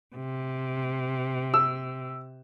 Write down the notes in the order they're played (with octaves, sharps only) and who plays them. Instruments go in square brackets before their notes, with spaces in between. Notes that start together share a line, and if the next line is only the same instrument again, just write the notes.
[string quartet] C3
[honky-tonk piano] E6